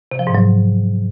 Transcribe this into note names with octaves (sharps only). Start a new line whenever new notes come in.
C3
F3
G#2
F#3